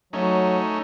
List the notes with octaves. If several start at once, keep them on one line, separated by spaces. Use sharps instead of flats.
F#3 A3 C#4 D#4